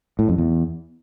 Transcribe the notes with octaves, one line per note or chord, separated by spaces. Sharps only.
A2
F2
E2